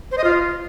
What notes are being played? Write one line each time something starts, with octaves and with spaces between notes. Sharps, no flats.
C5
D#5
F4